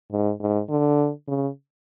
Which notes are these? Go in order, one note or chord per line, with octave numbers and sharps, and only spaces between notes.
G#2
G#2
D3
C#3